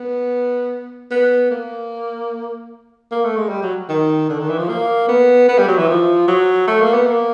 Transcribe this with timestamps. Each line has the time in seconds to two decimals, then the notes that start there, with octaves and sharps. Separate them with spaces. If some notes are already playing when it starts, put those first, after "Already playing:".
Already playing: B3
1.11 B3
1.51 A#3
3.11 A#3
3.24 A3
3.37 G#3
3.49 G3
3.63 F#3
3.89 D#3
4.29 D3
4.39 D#3
4.49 E3
4.58 F3
4.69 A#3
5.08 B3
5.48 B3
5.58 G3
5.68 F#3
5.78 E3
5.88 F3
6.28 F#3
6.67 A3
6.81 A#3
6.94 B3
7.07 A#3